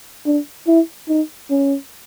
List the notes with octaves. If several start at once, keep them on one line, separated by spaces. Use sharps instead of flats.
D4
E4
D#4
C#4